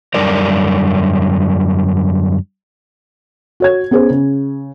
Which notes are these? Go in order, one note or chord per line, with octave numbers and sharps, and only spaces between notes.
F#2 D3 G3 A#4 D5
F#4 C#5 G#6
B3 C#4 G#4 C5
C#3